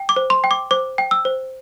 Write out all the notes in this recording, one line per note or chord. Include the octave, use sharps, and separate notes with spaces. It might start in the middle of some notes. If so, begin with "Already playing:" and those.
Already playing: G5
D6
C5
C6
G5
D6
C5 D6
G5
E6
C5